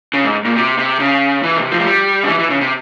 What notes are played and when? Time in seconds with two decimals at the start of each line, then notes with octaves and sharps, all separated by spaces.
0.14 C#3
0.25 G#2
0.45 A#2
0.56 C3
0.78 C3
1.00 C#3
1.43 E3
1.56 C3
1.71 F3
1.78 G#3
1.85 G3
2.23 C#3
2.28 E3
2.39 E3
2.50 C#3
2.61 C3